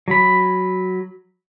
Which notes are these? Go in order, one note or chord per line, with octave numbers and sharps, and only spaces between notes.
F#3 B5